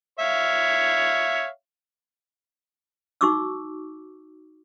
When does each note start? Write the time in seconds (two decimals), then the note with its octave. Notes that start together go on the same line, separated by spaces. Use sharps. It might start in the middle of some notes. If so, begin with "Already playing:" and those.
0.20 C#5 E5 F5
3.21 D#4 F#4 C#6 D6 E6